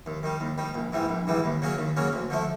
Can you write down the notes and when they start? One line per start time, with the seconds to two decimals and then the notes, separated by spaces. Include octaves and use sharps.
0.06 D#2
0.23 D#3 G3
0.40 D#2
0.58 D#3 G3
0.74 A#1
0.93 G#2 E3 G3
1.09 A#1
1.27 G#2 E3 G3
1.44 D#2
1.62 C#3 F#3 A#3 C#4
1.78 D#2
1.97 C#3 F#3 A#3 C#4
2.13 D2
2.30 D3 F3 A3